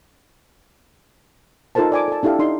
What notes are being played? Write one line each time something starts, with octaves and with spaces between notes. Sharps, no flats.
D#4 F4 A4 A#4 C5 A5
D5 G#5 D6
A4 A5
D4 E4 G4 A4 F5
D#4 D5 C6